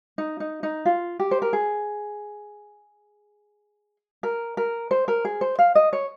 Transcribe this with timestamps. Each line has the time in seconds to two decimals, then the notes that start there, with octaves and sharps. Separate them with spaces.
0.18 D#4
0.40 D#4
0.63 D#4
0.85 F4
1.20 G4
1.31 C5
1.42 A#4
1.53 G#4
4.23 A#4
4.57 A#4
4.91 C5
5.08 A#4
5.25 G#4
5.41 C5
5.59 F5
5.75 D#5
5.93 C#5